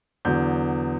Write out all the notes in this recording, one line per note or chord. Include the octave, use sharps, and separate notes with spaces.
E2 D3 F#3 G6